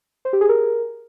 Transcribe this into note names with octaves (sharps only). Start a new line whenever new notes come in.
C5
G4
G#4
A#4